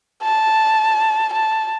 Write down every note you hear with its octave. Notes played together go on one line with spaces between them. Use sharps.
A5
A5